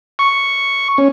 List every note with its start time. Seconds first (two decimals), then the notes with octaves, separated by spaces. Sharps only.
0.19 C#6
0.98 C#4